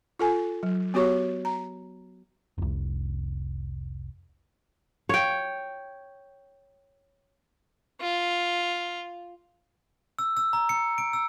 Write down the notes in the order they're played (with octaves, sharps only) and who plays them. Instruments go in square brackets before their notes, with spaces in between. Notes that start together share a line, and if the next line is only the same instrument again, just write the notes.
[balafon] F4 A4 G#5
F#3
B3 F#4 G4 C#5 C#6
A#5
[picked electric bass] F1 C2
[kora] C#5 G5
[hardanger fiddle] F4
[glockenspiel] E6
E6
A#5
C#7
D7
E6